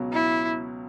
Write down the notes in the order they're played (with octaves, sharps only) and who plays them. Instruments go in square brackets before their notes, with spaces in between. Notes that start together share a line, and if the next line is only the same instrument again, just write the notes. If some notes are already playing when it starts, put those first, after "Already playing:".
Already playing: [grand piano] C#2 B2 F#3
[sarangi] E4